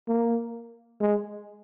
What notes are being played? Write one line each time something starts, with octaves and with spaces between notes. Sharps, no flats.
A#3
G#3